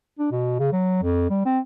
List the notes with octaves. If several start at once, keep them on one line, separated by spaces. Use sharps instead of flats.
D4
B2
C#3
F#3
F2
G3
C4